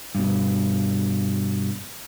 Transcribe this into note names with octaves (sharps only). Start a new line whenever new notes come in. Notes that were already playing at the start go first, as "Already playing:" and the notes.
G2 B2